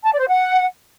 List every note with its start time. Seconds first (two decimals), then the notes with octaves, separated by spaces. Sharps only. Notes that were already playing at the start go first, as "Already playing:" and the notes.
0.04 A5
0.12 D5
0.20 C5
0.28 F#5